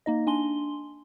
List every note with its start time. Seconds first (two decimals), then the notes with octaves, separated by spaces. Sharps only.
0.06 A#3 D#4 D#5
0.27 D4 G#5 C6 G7